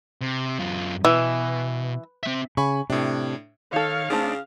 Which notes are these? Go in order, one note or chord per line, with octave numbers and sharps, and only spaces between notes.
C3
F#2 F4
B2 E3
C4 E5
C#3 G#5 B5 C#6
A2 C3 D4
D#3 D#4 A4 C#5 F5
C#3 A3 C4 D4 D#4